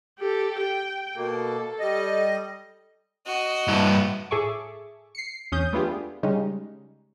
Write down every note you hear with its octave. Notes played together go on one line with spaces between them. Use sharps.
G4 A4
G5
B2 A#3 A4
G3 D#5
F#4 D#5
G2 E4
A2 G#4 A4 E5 C#6 D6
C7 C#7
E2 C#4 D#6 G6
A3 B3 D4 F4 G4 G#4
C#3 G3 G#3 C#4 D#4